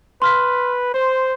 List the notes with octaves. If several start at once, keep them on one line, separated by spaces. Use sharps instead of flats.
B4 C6 F6 B6
C5 C6